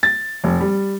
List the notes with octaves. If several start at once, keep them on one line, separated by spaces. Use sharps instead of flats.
A6
F1
G3